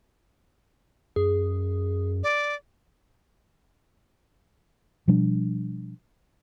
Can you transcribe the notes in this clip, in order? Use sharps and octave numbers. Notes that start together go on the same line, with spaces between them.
F#2 G#4
D5
B2 F3 G3 D4